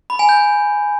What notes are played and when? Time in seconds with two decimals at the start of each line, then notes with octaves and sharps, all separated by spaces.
0.10 B5
0.19 G#5
0.29 G6